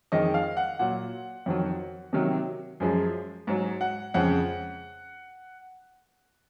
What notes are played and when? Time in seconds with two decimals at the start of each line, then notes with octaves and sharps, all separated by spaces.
0.12 F2 D#3 G#3 D#5
0.34 F5
0.57 F#5
0.79 A#2 F#3 F#5
1.46 F2 D#3 F#3
2.13 C3 D#3 F#3
2.80 F#2 F3 G#3
3.47 G#2 F#3
3.81 F#5
4.14 F2 C#3 G#3 F#5